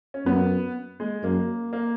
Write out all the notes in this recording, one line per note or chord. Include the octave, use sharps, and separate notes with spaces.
C#4
F#2 B3
G#3
F#2 A#3
A#3